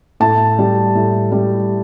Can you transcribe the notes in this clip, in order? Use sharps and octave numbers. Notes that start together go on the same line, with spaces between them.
A2 A5
G3
A2
G3